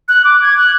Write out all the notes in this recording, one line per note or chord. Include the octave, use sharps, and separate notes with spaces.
F#6
D6
G#6
F#6